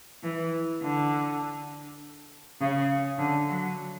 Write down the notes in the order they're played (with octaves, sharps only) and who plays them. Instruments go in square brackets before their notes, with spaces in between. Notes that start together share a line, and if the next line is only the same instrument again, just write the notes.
[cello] E3
D3
C#3
D3
F#3